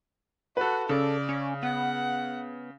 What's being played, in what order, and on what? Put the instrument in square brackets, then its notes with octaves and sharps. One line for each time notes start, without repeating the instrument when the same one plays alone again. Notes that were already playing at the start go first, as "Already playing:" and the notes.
[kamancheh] F#4 [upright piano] A4 B4
[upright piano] C#3 [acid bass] A4 [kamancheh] D5
[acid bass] C#4
[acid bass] B3 [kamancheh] F#5